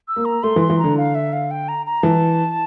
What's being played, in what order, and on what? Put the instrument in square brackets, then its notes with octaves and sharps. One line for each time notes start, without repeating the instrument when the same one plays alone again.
[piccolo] E6
[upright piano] A#3
[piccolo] A#5
[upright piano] A3 [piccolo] C6
[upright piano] E3
[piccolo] C6
[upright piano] E3
[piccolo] A#5
[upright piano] D3
[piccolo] F5
E5
F5
G5
A#5
A#5
[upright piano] E3 [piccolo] A5